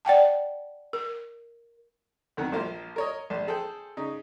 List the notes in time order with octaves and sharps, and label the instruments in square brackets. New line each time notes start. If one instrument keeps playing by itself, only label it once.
[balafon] D5 F#5 G5 A5
A#4
[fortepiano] B1 F2 D#3 F#5
A#1 F3 A#3 C5 F5
A#4 C#5 D#5
A#1 D5
G#4 A4 C5 G5
C#3 D#4